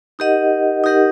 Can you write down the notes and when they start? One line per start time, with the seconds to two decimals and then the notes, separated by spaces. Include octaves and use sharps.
0.19 D#4 G4 A#4 D#5 F#5
0.84 D#4 G4 A#4 D#5 F#5